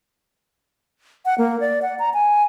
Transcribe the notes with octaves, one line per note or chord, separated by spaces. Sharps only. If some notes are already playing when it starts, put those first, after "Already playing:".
F#5
A#3
D5
F#5
A#5
G#5